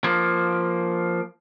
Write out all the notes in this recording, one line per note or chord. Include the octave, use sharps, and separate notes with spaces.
F3 A#3